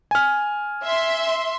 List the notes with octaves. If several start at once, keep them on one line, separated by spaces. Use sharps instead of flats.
G#5 F6
E5 C6